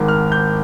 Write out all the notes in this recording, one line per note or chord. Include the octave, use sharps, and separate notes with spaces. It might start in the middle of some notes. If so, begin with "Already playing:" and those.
Already playing: G#1 G#2 D#3 D6
F6
G6